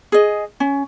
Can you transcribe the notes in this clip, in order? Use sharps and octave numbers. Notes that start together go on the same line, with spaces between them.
G#4 D#5
C#4